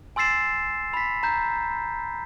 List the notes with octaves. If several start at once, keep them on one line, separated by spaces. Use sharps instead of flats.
G#5 C6 E6 A6 C7 E7
B5 B6
A#5 G6